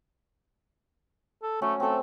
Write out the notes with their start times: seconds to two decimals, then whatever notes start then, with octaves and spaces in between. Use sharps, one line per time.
1.43 A4
1.62 F#3 A3 C#4
1.80 A3 C4 A4